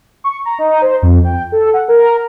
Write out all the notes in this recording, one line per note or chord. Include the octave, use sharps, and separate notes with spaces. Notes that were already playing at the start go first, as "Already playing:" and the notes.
C#6
A#5
D#4
C5
F2
G5
A4
F#5
A#4